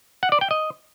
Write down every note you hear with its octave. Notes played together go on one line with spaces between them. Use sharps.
F#5
D5
G5
D#5